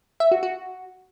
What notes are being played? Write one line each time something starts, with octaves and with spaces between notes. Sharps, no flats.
E5
F#4
F#4